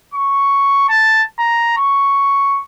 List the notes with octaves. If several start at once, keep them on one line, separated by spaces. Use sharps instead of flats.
C#6
A5
A#5
C#6